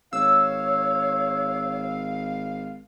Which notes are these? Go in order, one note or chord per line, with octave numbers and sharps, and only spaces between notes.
G#1 C#5 F5 E6